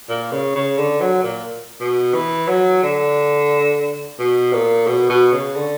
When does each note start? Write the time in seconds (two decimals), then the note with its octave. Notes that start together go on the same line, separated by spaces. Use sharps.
0.09 A#2
0.31 C#3
0.55 C#3
0.77 D3
1.00 F#3
1.23 A#2
1.80 B2
2.14 E3
2.48 F#3
2.83 D3
4.19 B2
4.53 A#2
4.87 B2
5.09 B2
5.32 C#3
5.55 D3